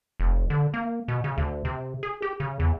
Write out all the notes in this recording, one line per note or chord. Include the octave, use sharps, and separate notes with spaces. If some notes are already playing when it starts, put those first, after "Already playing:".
F1
D3
A#3
B2
C#3
D2
C3
G#4
G4
C#3
E2